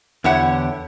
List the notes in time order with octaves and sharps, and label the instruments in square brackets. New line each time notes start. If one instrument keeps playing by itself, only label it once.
[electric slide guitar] E2 D3 G4 [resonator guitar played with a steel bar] E4 C#5 F#5